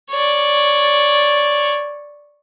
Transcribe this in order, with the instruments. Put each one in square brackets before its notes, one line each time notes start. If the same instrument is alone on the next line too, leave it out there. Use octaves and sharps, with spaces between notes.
[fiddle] C#5 D5